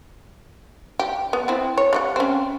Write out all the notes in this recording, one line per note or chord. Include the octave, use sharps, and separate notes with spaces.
G4
B3
C4 E4
C#5
G3 G4 F#5
C4 C#4